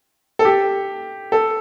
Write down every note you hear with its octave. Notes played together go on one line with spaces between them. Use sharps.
A4
G4
A4